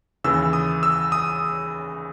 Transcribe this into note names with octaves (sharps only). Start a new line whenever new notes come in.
D#2 C#3 E3 E6
D#6
E6
D#6